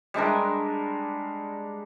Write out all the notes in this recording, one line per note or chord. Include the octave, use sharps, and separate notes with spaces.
G3 G#3 D4 A#4